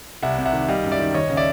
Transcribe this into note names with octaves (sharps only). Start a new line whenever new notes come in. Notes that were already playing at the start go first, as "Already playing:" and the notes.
C2 E5 F#5
C3
E5 F#5
D#3
G3 D#5 F5
F#2
D5 E5
D#3
D#2 C#5 D#5
C#3
D5 E5